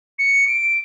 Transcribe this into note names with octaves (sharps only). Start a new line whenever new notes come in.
C#7
D7